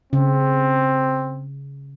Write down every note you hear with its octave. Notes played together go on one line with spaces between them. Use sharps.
C#3 C4